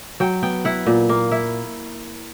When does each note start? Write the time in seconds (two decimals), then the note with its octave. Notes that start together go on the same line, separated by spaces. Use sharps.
0.20 F#3 G5
0.43 B3 G5
0.65 E4 F#5
0.86 A#2
1.09 A#3
1.31 E4